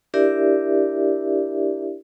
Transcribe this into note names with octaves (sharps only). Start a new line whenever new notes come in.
D4 E4 G4 A#4 D5 E5